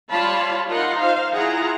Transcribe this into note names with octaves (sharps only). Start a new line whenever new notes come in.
G3 F4 C#5 F5 A5 B5
D#4 F4 A#4 F#5 A#5 C6
C5 F5
E4 F4 G#4 F#5 A#5